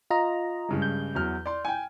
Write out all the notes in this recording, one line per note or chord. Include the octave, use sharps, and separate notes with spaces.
F4 D#5 A#5
G2 C#3 G#3
G6
E2 F#3 F6
D5 C6
G5 G#5